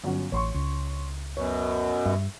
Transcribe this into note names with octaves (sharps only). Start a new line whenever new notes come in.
G1 F#3 C#4
A1 C#5 C6 C#6
C#2
F#2 B2 C#5
G2 E5